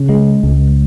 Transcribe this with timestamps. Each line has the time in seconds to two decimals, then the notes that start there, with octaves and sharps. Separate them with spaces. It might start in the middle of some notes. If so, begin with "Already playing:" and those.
Already playing: C#3
0.09 G#3
0.43 C#2